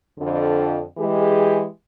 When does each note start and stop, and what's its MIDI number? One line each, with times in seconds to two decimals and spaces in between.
0.18 0.82 41
0.18 0.82 50
0.98 1.66 52
0.98 1.66 56
0.98 1.66 67
0.98 1.66 68